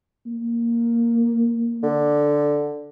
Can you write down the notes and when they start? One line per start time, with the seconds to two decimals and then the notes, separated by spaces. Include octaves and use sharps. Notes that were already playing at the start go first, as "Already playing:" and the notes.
0.26 A#3
1.83 D3